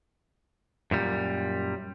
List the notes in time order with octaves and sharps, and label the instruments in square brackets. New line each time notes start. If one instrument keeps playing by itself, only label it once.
[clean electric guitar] F#2 A#2 G3